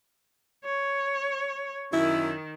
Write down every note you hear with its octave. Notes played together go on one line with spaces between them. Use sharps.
C#5
F#2 D#3 E4